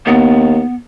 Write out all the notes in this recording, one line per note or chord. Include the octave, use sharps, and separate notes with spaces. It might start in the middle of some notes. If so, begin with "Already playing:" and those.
D#2 B3